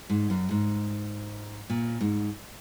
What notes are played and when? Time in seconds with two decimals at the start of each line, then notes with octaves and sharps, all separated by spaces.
0.10 G#2
0.30 F#2
0.51 G#2
1.70 A#2
2.01 G#2